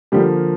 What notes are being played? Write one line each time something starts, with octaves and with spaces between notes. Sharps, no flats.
D3 F3 G3 A#3 G4